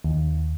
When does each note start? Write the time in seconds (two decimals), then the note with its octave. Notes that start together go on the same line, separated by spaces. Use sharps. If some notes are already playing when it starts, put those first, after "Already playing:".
0.04 D#2